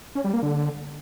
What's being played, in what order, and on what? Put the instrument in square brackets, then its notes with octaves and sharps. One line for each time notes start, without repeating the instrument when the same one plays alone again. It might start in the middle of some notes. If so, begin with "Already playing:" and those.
[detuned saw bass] C#4
G3
A#3
D3